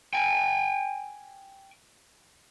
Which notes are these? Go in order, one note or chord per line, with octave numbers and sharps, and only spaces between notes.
G5 G#5